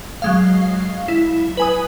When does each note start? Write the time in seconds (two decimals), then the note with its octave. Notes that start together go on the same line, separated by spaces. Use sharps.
0.22 F#3 G#3 F5
1.08 E4
1.57 B4 G#5 D#6